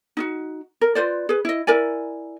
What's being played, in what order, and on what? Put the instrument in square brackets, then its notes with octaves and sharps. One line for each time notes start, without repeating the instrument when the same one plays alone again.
[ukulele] D#4 F4 F#4
A#4
F4 B4 C5 D5
G#4 B4
E4 D#5
E4 A#4 D5 G#5